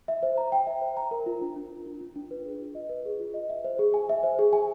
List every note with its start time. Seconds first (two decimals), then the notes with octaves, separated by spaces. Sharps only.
0.08 E5
0.23 C5
0.38 A#5
0.52 G5
0.67 E5
0.82 C5
0.97 A#5
1.11 A#4
1.26 F4
1.41 D4
1.56 D4
1.72 A#4
1.86 F4
2.01 D4
2.16 D4
2.31 B4
2.45 G#4
2.61 F4
2.75 D#5
2.89 B4
3.05 G#4
3.20 F4
3.34 D#5
3.50 E5
3.64 C5
3.79 G#4
3.94 G#5
4.09 E5
4.23 C5
4.39 G#4
4.53 G#5